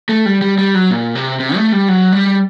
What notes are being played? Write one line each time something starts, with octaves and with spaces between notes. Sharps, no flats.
A3
G3
G3
G3
F#3
A#2
C3
C3
A3
G3
F#3
G3